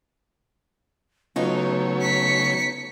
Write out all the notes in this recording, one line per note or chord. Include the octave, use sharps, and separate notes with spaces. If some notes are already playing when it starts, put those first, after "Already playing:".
C#3 F#3 A3 B3 D#4 F4 C#5
B6 C#7